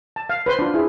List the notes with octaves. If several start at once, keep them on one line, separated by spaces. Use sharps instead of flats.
A5
F5
B4 C5 C6
D4 F4
E4 G#4